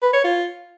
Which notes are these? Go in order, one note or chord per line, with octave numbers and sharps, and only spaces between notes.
B4
C#5
F4